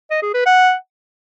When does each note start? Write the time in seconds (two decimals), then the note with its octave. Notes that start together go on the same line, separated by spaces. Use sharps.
0.11 D#5
0.22 G#4
0.34 B4
0.46 F#5